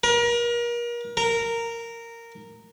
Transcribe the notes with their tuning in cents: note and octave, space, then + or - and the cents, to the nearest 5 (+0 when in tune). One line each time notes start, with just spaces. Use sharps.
A#4 +35
A#4 -10